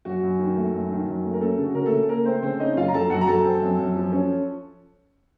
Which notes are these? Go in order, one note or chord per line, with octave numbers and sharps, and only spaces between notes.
F#2 F#4
F#2
D#3
A3
F#2
D#3
F#2
A3
A#4
A3 C#4 A4
C#3
F#4
C#3 A#4
A3 A4
C#3
A3 A#3 A#4
A3 C4 C5
C#3 C4 C5
C#4 D#4 D#5
F#2 F4 F5
A#5
F#2 A4 A5
F#2 F#4 F#5
A#5
F#2 A4 A5
C4
F#2
F#2
F3
C#4